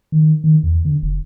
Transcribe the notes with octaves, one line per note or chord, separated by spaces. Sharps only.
D#3
D#3
E2
D3
F1